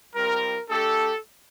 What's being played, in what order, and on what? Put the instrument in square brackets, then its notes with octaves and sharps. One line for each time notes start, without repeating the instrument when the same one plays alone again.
[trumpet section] G3 C4 F4 A#4
A3 D4 G4 A4